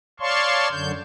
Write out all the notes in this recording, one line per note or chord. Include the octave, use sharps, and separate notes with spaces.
C#5 D5 F5 A5 C6 C#6
F#2 D3 G6